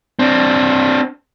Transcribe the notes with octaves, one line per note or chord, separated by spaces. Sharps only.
C4 D4